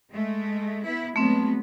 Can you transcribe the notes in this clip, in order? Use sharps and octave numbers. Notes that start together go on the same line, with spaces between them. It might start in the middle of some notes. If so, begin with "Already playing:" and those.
G#3 A3
B3 E4
F#3 G#3 A3 B3 C4